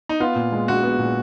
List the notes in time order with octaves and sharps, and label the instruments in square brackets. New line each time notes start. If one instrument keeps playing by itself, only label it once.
[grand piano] D#4
[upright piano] B3 [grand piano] F4
[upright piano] A#2
G#3
[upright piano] A#1 [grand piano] F#4
[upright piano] B3
A#2